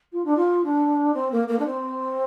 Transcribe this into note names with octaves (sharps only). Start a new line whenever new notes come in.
F4
D4
F4
D4
C4
A#3
A#3
D4
C4